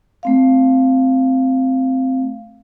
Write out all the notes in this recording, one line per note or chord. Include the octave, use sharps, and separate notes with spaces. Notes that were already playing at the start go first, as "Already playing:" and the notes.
A3 C4 F5